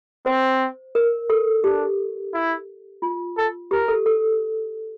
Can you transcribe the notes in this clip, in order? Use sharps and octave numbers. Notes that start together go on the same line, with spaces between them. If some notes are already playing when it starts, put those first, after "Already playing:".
C4 C5
A#4
A4
D4 G4
E4
F4
A4
G4 A#4
A4
A4